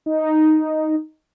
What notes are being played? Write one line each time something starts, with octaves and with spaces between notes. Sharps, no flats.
D#4